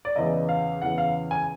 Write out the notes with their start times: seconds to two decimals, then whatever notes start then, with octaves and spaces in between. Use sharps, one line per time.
0.05 D5
0.16 E2 C#3 E3 D#5
0.49 F5
0.82 E2 C#3 E3 F#5
0.98 F5
1.31 G#5